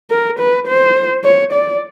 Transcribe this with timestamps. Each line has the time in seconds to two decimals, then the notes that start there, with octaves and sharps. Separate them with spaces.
0.10 A#4
0.39 B4
0.67 C5
1.24 C#5
1.53 D5